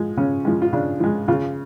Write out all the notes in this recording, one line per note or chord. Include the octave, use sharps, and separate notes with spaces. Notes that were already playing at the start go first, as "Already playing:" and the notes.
Already playing: F3 G#3
C#3 C#4
F3 G#3
F4
C#3 D4
F3 G#3
C#3 F4